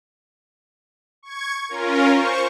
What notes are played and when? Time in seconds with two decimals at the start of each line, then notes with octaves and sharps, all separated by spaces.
1.23 C#6 G#6
1.69 C#4 F4 A#4
2.10 C5 C#6